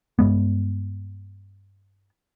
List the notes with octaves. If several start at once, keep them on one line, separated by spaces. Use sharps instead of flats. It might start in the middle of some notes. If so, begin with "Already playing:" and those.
G2 G#3 B3